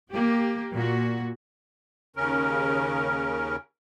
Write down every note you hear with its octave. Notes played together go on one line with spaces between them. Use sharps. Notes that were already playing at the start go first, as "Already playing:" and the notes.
A#3 G4
A#2 F#4
D#2 C#3 C#4 A#4